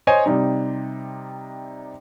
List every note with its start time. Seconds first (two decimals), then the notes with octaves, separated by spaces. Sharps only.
0.07 C5 C#5 D#5 G#5
0.26 C3 G3 D#4